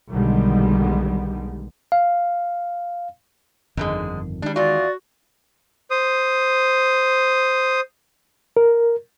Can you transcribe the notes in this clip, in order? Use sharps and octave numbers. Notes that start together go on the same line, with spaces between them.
B1 D3 D#3 G3 G#3 B3
F5
G1 F2 G#2 D3 D#3 G#3
D#3 G3 G#3 D4
E2 F4 F#4 D5
C5 D#6
A#4